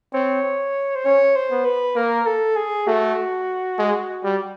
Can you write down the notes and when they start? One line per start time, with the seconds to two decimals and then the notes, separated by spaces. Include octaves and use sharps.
0.13 C4 C#5
0.95 C5
1.05 C#4 C#5
1.36 C5
1.51 B3
1.65 B4
1.96 A#3 A#4
2.27 A4
2.57 G#4
2.87 A3 F#4
3.79 G#3
4.24 G3